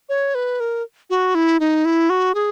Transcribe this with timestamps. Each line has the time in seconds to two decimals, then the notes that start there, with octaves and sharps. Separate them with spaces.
0.09 C#5
0.35 B4
0.60 A#4
1.10 F#4
1.35 E4
1.60 D#4
1.85 E4
2.10 F#4
2.35 G#4